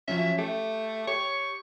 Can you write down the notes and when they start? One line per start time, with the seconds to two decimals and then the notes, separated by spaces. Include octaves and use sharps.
0.08 F3 F#3 C#4 E5
0.38 A3 G4
1.07 G4 C#5 C#6